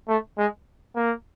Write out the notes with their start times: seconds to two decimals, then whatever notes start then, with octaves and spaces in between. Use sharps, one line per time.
0.08 A3
0.38 G#3
0.95 A#3